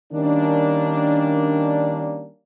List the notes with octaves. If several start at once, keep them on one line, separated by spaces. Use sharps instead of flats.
D#3 G3 A#3 C#4 D4